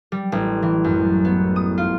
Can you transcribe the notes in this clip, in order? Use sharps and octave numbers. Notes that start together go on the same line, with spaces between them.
G3
A1
E3
F#2
B3
D#6
F4